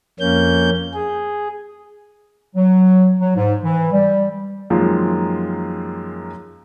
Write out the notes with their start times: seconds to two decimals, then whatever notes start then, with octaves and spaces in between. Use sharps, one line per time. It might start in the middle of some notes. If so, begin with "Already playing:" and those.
0.20 F2 A#3 C#4 G6
0.94 G#4
2.56 F#3
3.20 F#3
3.35 G#2
3.63 E3
3.93 G3
4.70 F#2 D#3 F3 G#3 A#3 F4